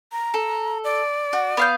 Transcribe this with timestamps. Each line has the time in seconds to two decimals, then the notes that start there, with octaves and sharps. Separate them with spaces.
0.12 A#5
0.34 A4
0.84 D5
1.33 F#4
1.57 B3 F5 G6